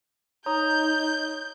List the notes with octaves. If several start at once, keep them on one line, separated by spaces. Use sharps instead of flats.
D#4 C#5 A#5 D#6 G6